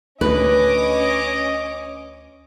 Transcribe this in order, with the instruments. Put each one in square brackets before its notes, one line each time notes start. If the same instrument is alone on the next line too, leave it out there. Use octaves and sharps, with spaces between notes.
[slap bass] D2 [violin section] C#4 C#5 D6 [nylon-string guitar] B4 [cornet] D#5